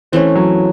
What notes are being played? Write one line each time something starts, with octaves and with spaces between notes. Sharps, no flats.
E3 A3 C4 C#4
F#3